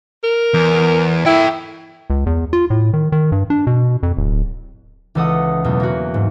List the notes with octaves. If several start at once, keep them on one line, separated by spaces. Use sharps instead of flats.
A#4
E2
E4 A4 G5
C#2
E2
F4
A2
D#3
D#3
G2
D4
B2
F2
D1
C#2 E3 A4 D#5 F#5 D#6
E2 B2 F#3 A3
A#3 F#4
G#2